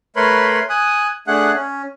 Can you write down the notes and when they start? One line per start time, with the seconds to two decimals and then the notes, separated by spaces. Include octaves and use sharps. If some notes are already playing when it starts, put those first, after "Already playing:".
0.16 A3 A#4 B4 C#5 B5 C6
0.70 G#5 D#6 F#6
1.27 A3 D4 G#4 F#5 F#6
1.54 C#4